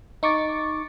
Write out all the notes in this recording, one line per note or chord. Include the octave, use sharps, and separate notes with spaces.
D#4 C#6 D6 A6